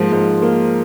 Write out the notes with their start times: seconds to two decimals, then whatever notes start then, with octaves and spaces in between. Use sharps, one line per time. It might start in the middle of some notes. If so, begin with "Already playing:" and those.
Already playing: G#2 F3 A#3
0.12 G#2
0.42 A#3